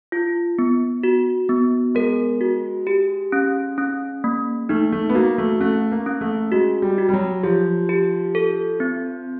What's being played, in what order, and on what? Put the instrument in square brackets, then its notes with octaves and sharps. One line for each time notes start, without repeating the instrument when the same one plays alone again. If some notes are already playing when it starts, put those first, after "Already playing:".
[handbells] F4
B3
F#4
B3
[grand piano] G#3 [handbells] A#4
[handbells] F#4
G4
C#4
C#4
A#3
[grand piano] A3 [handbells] D#4
[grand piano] A3
B3
[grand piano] A#3 [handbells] F#4
[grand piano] A3
[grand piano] A3 [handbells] C#4
[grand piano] A#3
[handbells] C#4
[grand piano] A3
[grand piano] G#3 [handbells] F#4
[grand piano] G3
[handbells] F#4
[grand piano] G3
F#3
[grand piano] F3 [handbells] G4
[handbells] G4
A4
C4